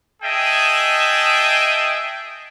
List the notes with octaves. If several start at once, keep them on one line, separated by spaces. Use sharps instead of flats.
G#4 D#5 E5 G5 A5